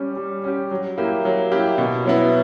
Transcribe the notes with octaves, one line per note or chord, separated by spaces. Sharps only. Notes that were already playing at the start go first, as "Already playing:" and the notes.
Already playing: G3 C#4 G4
G3
C#4 G4
F#3
A#3 E4 G4
F#3
A#3 E4 G4
B2
F#3 B3 E4